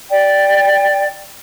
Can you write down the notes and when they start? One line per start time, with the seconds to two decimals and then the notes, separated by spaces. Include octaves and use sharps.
0.08 D5 G5